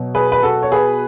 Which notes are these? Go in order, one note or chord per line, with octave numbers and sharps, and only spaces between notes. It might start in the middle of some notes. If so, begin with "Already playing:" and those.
Already playing: B2 F#3
G#4 B4
B4
F#4 A4
C#5
G#4 B4